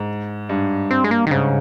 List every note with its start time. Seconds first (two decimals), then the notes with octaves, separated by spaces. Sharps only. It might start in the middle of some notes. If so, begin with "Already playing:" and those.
Already playing: G#2
0.49 G2
0.91 C4
1.04 G#3
1.11 A#3
1.27 D#3
1.31 G#2 C#3